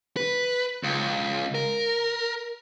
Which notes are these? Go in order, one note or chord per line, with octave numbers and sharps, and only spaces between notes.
B4
C#2
A#4